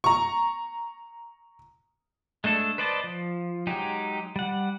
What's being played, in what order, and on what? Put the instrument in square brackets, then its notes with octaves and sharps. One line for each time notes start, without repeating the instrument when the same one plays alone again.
[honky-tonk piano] A#5 C#6
[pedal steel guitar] G#3 A3 D4 A4
B4 C5 D5 D#5 A5
F3
F#3 G#3 D#4 G4
G3 F#5